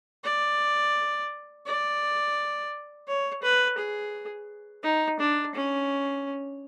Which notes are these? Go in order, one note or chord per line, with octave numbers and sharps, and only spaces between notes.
D5
D5
C#5
B4
G#4
D#4
D4
C#4